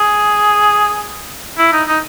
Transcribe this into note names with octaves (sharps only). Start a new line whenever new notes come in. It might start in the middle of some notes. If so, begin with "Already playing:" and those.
Already playing: G#4
E4
D#4
D#4